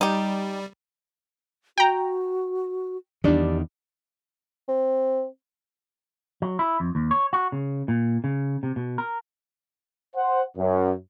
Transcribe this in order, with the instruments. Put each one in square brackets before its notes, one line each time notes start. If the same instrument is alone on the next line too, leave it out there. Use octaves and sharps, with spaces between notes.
[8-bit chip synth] G3 [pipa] D#4 G4
[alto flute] F#4 [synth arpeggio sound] G5 A#5
[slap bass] E2 D#3 [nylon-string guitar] G3 D4
[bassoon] C4
[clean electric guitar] F#3
E4
F2
D#2
C#5
F#4
C#3
A#2
C#3
C3
B2
A#4
[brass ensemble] C5 F#5
F#2